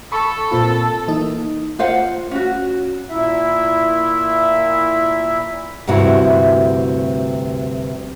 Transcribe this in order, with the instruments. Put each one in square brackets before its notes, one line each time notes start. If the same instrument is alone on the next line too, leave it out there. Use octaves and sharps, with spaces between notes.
[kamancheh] A4 [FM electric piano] B5 C#6
[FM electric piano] A#2 C4 F4
E3 A#3 D#4
[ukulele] F4 C5 F5 F#5
C#4 F#4
[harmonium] A#2 E4 E5
[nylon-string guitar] D2 G2 C3 E4 F#4